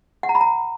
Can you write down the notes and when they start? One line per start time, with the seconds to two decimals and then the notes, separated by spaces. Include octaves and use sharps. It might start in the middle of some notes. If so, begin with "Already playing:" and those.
0.23 F#5
0.29 A#5
0.35 B5
0.41 A#5